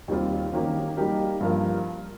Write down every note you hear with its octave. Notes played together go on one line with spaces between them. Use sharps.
D#2 D#3 G3 C4 F4
D#3 A#3 C#4 G4 A#4
G3 A#3 D#4 G4 A#4
G2 F3 A#3 F4 A#4